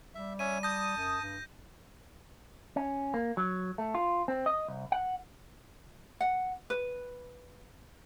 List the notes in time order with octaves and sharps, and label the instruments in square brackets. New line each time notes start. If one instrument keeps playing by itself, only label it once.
[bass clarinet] G3 [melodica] E5
[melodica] C#4 C#5 E5 [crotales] D#7
[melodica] A5 [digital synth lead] D#6 [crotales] G6 A#6
[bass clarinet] F#2
G2
[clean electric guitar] C#4
A#3
F#3
A3
F4
C4
D#5
C2
F#5
[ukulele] F#5
B4